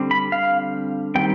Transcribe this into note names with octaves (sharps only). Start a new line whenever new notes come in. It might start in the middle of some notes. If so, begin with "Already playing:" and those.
Already playing: D3 G3 C4
B5
F5
D#3 G3 C4 G5